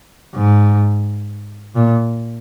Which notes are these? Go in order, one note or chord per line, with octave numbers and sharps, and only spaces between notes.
G#2
A#2